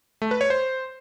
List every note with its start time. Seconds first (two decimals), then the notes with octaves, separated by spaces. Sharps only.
0.22 A3
0.31 B4
0.41 C#5
0.50 C5